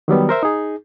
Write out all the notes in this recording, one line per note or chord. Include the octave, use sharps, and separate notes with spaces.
D#3 F#3 G3 B3
A#4 C5 E5
D#4 G#4